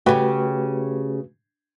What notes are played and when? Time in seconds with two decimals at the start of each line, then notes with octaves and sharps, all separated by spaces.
0.06 C#3 A3 F#4 G4 B4